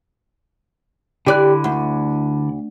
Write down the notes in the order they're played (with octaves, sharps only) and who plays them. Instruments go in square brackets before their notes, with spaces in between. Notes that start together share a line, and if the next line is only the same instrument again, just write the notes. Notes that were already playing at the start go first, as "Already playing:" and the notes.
[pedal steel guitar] D3 E4 F#6 [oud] G4 D5
[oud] D2